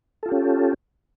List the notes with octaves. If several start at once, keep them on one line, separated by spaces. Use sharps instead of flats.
C#4 F4 G4 A4